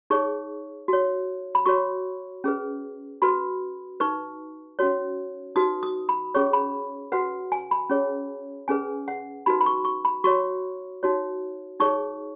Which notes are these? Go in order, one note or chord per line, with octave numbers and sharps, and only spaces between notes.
D#4 G#4 C#5 C#6
F#4 C#5
B5
F#4 C#5 C#6
C#4 G#4 B4
F#4 B4 B5
D#4 B4 C#6
C#4 F#4 C#5
D#4 F#4 B4 D#6
D#6
B5
C#4 G#4 C#5 C#6
B5
F#4 B4 F#5
G#5
B5
C#4 G#4 C#5
C#4 G#4 B4 G#5
F#5
D#4 F#4 B4 B5
B5
C#6
C#6
B5
F#4 C#5 C#6
D#4 F#4 C#5
D#4 G#4 C#5 C#6